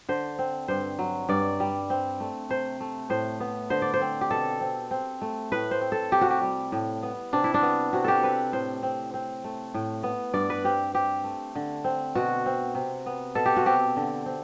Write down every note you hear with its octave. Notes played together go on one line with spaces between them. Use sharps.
D3 C5
C4
G2 C5
F#3
G2 D5
G3
C4
A3
C3 C5
A3
A2 C5
B3
D3 C5
D5
C5
C4
G4
B2 A4
C4
C4
A3
A2 B4
C5
C4
A4
C3 G4
F#4
G4
G3
A2
B3
C3 D4
E4
D4
B3
C3 F#4
G4 A4
C4 B4
A2 C5
C4
C4
A3
A2
B3
G2 D5
B4
C4 G4
C4 G4
A3
D3
C4
B2 F#4
C4
C3
B3
B2 A4
G4
F#4
C4 G4
D3
C4